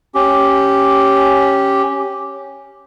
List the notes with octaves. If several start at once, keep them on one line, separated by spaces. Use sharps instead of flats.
C#4 G4